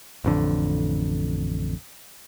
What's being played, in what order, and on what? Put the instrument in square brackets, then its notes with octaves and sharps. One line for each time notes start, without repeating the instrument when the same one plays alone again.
[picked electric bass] A1 F2 D3